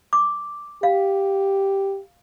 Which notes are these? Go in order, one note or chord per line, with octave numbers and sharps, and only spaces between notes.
D6
G4 F5